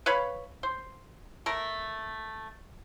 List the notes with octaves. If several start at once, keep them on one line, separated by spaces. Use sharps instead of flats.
B4 C#5 F5 B5
C5
A3 A#4